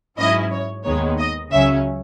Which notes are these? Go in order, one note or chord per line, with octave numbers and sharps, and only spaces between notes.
G#2 F#3 C#4 E4 D#5
C#5
D#2 D#3 G#3 B3 D#4 C#5
D#5
C#2 C#3 F#3 C#4 E5